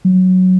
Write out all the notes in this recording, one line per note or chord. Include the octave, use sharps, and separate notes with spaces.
F#3